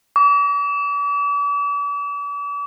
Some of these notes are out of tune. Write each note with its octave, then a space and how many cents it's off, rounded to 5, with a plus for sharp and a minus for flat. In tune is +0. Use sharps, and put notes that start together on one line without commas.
D6 -40